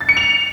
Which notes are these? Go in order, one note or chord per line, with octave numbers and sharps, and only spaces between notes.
A6
C#7
F7